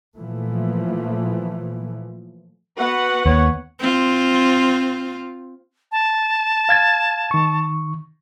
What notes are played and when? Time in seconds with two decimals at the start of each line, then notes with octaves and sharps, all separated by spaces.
0.16 A#2 E3 F3 A3
2.78 B3 F#4 B4 F#5
3.26 D#2 C#5
3.79 C4 F4
5.92 A5
6.69 F5 G#6 A6
7.31 D#3 C#6